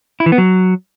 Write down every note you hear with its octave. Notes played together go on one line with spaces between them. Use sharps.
E4
E3
B3
F#3